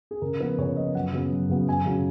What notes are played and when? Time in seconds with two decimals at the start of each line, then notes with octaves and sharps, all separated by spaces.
0.11 G#4
0.21 C#3 A#4
0.40 F3 B3 B4
0.58 C#3 C#5
0.76 F3 B3 D#5
0.95 F#2 F#5
1.13 C#3 F#3 B3
1.32 F#2
1.49 C#3 F#3 B3
1.69 F#2 G#5
1.86 C#3 F#3